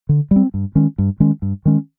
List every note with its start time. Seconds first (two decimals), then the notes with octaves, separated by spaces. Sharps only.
0.09 D3
0.31 G3 C4
0.54 G2
0.75 D#3 G#3 C#4
0.98 G2
1.20 D#3 G#3 C#4
1.42 G2
1.65 D#3 G#3 C#4